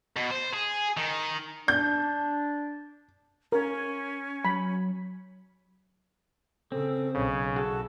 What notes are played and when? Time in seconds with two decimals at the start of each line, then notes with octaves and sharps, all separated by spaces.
0.16 B2
0.31 C5
0.54 G#4
0.97 D#3
1.68 D4 G6
3.52 C#4 A#4
4.45 F#3 B5
6.72 C#3 C4 A4
7.14 B1 C#3 C#5
7.56 F#4 G#4 A4